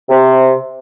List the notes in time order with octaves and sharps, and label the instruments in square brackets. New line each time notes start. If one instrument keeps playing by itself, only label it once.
[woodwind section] C3